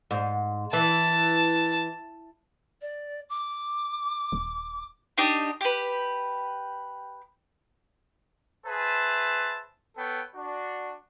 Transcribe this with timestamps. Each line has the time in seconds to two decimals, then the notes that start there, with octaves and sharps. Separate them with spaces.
0.11 G#2
0.73 E3 A5
2.81 D5
3.29 D6
4.32 D#1
5.18 D4 D#4 G4
5.61 G4 B4
8.66 G#4 B4 C5 E5 A5
9.97 B3 A4 B4 C#5 G5
10.35 D4 F#4